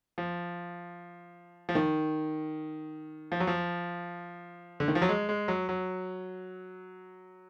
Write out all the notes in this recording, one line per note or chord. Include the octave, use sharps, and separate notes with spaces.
F3
F3
D#3
F3
F#3
F3
D3
D#3
F3
F#3
G#3
G#3
F#3
F#3